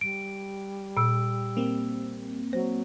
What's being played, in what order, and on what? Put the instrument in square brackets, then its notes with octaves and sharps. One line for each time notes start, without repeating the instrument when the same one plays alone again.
[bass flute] G3 [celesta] D7
[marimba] A#2 [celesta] E6 D7
[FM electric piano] A#3 C4
[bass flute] F#3 [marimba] C5